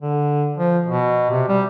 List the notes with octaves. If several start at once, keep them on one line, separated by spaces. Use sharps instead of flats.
D3
F3
B2
C3
G3